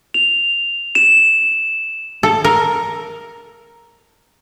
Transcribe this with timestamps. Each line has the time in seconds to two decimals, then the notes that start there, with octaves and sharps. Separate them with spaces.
0.14 F7
0.95 E7
2.23 A4
2.44 A#4